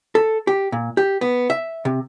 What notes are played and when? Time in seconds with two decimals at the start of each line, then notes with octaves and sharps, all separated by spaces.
0.15 A4
0.47 G4
0.72 A#2
0.97 G4
1.21 B3
1.50 E5
1.85 C3